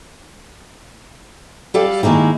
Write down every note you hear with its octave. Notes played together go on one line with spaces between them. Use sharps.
G3 G4 A4 D5 F5
D#3 G#3 A#3 D#4 E4